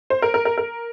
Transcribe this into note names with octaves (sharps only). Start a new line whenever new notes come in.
C5
A#4
A#4
A#4
A#4